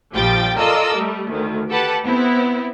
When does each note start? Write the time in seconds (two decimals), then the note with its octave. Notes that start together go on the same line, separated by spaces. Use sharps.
0.13 A#1 F3 G3 G5 A6
0.57 F4 A4 A#4 D5 D#5 E6
0.96 G3 A3
1.30 D2 D#3
1.70 G4 A4 B4 F#5 A5
2.04 B3 C4 E4